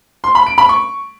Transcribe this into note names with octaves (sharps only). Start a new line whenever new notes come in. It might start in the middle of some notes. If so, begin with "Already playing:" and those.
C6
B5
D7
B5
C#6